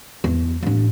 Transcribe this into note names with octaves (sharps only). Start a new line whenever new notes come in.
E2
A1 D4